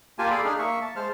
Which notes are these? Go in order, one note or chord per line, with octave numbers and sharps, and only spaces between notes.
A#3 F4 G4 G#5 A5
G#4 A4 D5 F5 B5
D4 D#4 G#4 F6
A#3 E5 C#6
A5
G#3 C5 A5 F6